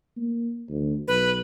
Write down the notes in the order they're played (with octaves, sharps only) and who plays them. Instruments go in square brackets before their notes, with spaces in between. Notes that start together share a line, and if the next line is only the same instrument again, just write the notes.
[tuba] A#3
D2
[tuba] B1 [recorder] B4